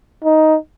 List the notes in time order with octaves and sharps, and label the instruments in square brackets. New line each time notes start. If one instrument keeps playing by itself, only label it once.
[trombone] D#4